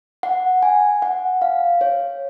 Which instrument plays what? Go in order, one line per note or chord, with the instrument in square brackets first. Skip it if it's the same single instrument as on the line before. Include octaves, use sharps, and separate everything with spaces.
[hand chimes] F#5
G#5
F#5
F5
C#5